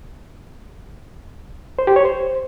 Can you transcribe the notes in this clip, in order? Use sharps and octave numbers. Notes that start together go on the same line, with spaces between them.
C5
G4
C#5
C5